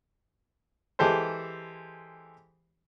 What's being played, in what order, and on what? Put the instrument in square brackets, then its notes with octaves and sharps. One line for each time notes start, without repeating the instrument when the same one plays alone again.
[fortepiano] E3 G#3 G4 A4 C5